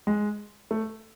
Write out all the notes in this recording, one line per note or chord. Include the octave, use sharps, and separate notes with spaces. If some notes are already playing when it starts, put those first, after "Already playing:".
G#3
A3